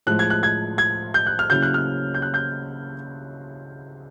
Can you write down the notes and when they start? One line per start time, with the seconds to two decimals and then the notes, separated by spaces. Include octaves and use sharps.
0.07 A2 F3 G#3 F#6
0.19 G#6
0.30 F#6
0.43 G#6
0.78 G#6
1.14 G6
1.27 F#6
1.39 F6
1.50 C#3 F#3 A#3 C#4 E4 G6
1.62 F#6
1.74 F6
2.14 G6
2.22 F#6
2.34 G6